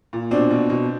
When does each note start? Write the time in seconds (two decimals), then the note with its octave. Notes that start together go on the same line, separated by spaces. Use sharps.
0.13 A#2
0.31 B2 C4 D4
0.50 B2
0.70 B2